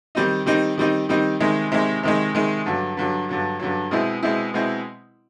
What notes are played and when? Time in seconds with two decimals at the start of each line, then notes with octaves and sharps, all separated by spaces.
0.15 D#3 G3 C4 D#4
0.46 D#3 G3 C4 D#4
0.78 D#3 G3 C4 D#4
1.09 D#3 G3 C4 D#4
1.40 C3 D#3 G#3
1.72 C3 D#3 G#3
2.03 C3 D#3 G#3
2.34 C3 D#3 G#3
2.66 G2 D3 F#3
2.97 G2 D3 F#3
3.29 G2 D3 F#3
3.59 G2 D3 F#3
3.91 B2 G#3 C4 E4
4.22 B2 G#3 C4 E4
4.54 B2 G#3 C4 E4